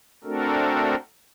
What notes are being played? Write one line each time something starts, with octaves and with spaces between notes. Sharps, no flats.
A3 C4 D4 F#4 A4 A#4